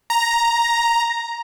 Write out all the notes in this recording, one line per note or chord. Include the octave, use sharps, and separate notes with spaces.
A#5